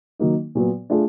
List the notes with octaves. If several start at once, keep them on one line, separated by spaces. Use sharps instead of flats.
D#3 F#3 A#3 D#4
A#2 F#3 B3
A3 D4 F4 G#4